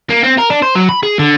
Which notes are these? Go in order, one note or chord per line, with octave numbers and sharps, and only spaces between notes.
A#3
C4
A#4
D4
C5
F#3
B5
G#4
D3